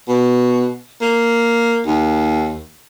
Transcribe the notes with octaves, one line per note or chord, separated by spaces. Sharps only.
B2
A#3
D#2